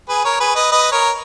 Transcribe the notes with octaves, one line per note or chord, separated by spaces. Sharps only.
G#4 B4
A#4 C#5
G#4 B4
B4 D#5
B4 D#5
A#4 C#5